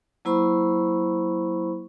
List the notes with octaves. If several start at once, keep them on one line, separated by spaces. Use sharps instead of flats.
F#3 A#3 E4 C5 B5 C#6